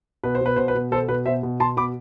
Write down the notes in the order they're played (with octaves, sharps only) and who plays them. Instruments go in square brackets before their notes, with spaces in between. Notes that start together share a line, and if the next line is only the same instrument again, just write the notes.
[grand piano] B2 B4
C5
B2 B4
B2 C5
B4
B2
B2 A4 C5
B2 B4
B2 C5 E5
B2
B2 A5 C6
B2 B5 D6